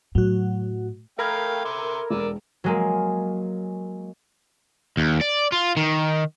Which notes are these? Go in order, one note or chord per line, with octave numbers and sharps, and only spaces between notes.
A2 F#3 F#4
A3 A4 A#4 F5 G5 B5 G#6
E5 C6 D6
E1 D5 E6
F#3 G#3 A#3
D#2
D5
F4
D#3